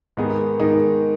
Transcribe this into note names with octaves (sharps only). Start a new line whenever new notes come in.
G#2 D#3 B3 D#4 G#4
G#2 D#3 B3 D#4 G#4